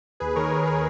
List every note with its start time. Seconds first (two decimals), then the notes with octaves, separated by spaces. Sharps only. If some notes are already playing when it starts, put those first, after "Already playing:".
0.20 D#2 G#4 B4
0.36 D#3 A#4 C#5
0.52 D#2 A#4 C#5
0.67 D#3 G#4 B4